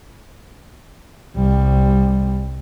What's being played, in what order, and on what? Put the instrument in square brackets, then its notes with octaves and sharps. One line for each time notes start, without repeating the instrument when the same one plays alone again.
[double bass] C2 G3